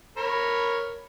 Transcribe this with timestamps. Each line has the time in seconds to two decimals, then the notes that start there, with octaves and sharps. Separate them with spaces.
0.17 A#4 C#5 B5